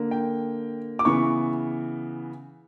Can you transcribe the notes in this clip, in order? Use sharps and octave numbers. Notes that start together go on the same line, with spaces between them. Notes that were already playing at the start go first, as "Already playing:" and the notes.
Already playing: D3 A#3
G5
D6
C#3 E3 B3 C#6